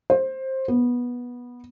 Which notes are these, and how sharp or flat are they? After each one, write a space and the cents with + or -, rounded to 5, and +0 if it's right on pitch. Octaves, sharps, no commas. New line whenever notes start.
C5 +15
B3 -15